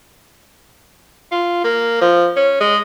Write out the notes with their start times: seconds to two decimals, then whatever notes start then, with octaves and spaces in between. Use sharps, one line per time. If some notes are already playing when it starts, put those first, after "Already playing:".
1.31 F4
1.64 A#3
2.01 F3
2.36 C#4
2.60 G#3